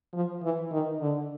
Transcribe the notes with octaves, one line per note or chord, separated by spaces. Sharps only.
F3
E3
D#3
D3